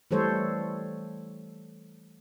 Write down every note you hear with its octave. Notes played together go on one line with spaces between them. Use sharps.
E3 G3 A3 A4 C5 C#5